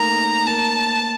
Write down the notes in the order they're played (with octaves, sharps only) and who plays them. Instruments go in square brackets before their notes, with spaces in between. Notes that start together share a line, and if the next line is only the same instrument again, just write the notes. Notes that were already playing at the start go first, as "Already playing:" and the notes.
Already playing: [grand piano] A3 A#3 D#4 [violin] A#5
[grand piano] A#3 [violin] A5